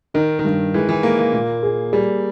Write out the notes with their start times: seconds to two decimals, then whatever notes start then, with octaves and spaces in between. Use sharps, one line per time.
0.14 D#3 D#4
0.39 D#3
0.45 G2
0.74 E3 G#3
0.89 E3
1.03 G#3 A#3
1.19 A#3
1.33 A#2
1.63 G#4
1.93 G3 G#4